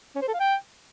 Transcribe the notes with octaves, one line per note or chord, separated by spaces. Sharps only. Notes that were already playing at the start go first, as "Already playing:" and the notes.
C#4
C5
A4
F5
G5